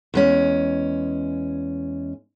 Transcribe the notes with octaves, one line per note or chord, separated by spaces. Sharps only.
E2 G#3 C#4